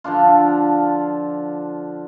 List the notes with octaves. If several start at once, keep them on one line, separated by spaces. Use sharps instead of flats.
D3 F3 D4 F4